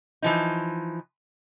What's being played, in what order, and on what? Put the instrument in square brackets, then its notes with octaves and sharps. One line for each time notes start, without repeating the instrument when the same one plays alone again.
[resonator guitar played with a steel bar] E3 F3 D#4